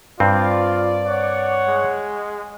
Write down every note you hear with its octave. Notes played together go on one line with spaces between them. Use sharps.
G2 C4 F4 D5
C#5 F#5
G#3